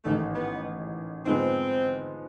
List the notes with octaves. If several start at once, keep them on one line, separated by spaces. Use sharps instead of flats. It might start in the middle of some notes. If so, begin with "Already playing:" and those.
A1 G#2 D#3 A3
B3
G#2 F3 G#3 B3 C4